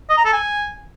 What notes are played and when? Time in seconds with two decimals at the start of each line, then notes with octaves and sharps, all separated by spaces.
0.10 D#5
0.17 A#5
0.25 A4
0.33 G#5